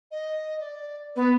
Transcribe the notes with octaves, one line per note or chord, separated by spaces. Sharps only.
D#5
D5
B3 B4